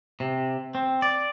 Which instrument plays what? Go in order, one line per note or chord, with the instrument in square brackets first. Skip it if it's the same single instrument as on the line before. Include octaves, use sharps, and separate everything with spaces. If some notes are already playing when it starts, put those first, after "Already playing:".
[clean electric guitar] C3
C4
D5